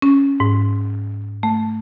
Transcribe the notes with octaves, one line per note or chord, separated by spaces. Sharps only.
C#4
G#2
A3